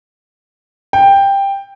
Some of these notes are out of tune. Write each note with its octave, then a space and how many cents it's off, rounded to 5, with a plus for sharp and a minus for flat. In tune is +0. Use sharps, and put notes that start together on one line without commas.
G5 +10